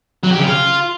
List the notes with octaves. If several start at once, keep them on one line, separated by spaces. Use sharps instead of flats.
F#3
G4
C#3
F4